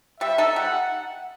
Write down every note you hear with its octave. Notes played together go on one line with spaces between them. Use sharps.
G3 E5
D#4 A4
G3 F#5